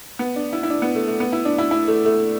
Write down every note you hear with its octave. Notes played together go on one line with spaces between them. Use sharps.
B3
D4
E4
E4
D4
B3
A3
A3
B3
E4
D4
E4
E4
A3
A3